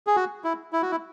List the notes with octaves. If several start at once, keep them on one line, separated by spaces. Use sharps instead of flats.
G#4
F#4
E4
E4
F#4
E4